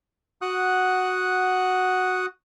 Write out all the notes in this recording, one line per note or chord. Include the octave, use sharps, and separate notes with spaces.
F#4 F#5 D#6 F#6